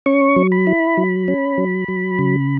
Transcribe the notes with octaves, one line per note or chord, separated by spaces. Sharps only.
C#4 C#6
F#3
B5
E4
F#3
C#4
F#3
F#3
C#3